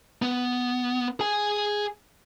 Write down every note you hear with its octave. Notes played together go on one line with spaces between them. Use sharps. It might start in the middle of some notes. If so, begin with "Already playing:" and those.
B3
G#4 G#5